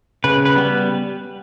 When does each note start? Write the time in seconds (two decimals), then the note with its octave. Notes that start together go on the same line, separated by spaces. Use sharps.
0.24 C#3 B4
0.45 B4
0.56 G3 B3